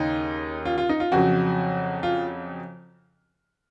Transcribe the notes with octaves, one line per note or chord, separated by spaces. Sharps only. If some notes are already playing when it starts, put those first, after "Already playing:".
Already playing: D#2 C#3 D#4
F4
F4
D#4
F4
F2 C#3 F#3 F#4
F4